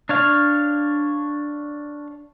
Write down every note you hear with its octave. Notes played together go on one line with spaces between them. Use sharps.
D4 C#5 F5